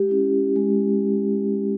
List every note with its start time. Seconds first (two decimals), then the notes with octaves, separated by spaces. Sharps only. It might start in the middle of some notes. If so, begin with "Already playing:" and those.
Already playing: G#3 G4
0.09 C#4 E4
0.56 G#3